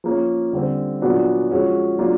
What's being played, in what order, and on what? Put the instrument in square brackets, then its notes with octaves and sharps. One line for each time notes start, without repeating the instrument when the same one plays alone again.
[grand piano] F3 A#3 C#4
D3 G3 C4
A#2 F#3 B3 D4 F#4
F3 G#3 C#4 F#4
F#3 A#3 D4 F4